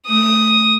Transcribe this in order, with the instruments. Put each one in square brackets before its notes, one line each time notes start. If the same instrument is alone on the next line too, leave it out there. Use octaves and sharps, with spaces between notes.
[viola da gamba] A3 [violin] D#6